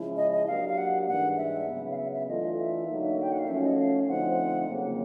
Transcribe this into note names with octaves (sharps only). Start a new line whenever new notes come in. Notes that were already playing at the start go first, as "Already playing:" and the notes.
Already playing: C#3 F3 G#3 C#4 E4
D#5
D#5
F#3 A#3 D4 G4 F5
F5
F#5
G#2 E3 G3 A#3 D4 F#5
E5
C#3 F#3 B3
F5
E5
E5
E3 A3 D4 F4 A4 D#5
E5
D3 F#3 A#3 D#4
G5
F#5
F5
F3 A3 C#4 F#4 E5
D#5
F5
D3 F3 A3 C4 D#4 F#5
F2 C#3 F#3 A#3